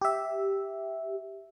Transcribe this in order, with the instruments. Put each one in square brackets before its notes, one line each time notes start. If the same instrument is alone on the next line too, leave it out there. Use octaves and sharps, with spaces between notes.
[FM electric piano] G4 E5